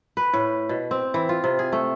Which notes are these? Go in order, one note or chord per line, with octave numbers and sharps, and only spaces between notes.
B4
A2
B2
C4
E3
F4
C3
G#4
A3